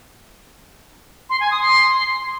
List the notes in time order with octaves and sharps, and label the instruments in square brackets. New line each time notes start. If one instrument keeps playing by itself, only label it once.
[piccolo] C6
G#5
D#6
C6